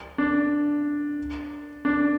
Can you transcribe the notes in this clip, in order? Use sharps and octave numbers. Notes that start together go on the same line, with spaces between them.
D4
D4